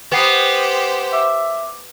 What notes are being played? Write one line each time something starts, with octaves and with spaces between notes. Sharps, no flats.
B3 G4 C5 G5 C7
E5 D6